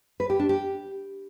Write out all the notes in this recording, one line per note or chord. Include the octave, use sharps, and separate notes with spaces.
B4
G4
D4
G4